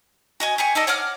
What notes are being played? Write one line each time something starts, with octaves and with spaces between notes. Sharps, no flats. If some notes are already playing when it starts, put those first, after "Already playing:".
F#4 D#5 G#5
G4 G#5 C#6
D#4 A4 D5 D#5
C#5 F#5 D6 F6